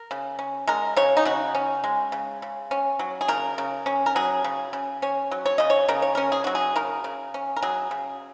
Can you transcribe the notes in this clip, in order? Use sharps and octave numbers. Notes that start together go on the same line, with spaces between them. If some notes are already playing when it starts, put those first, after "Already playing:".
Already playing: A#4
C#3
C#4
G#3 A#4
C#3 C#5
D#4
C#3 F#4
C#4
G#3
C#3
C#3
C#4
F#3
G#4
C#3 A#4
C#3
C#4
A#4
F#3 G#4
C#3
C#3
C#4 C#5
F#3
C#5
C#3 D#5
C#5
C#3 A#4
C#5
C#4 A#4
G#4
F#3 F#4
G#4
C#3 A#4
C#3
C#4
A#4
F#3 G#4
C#3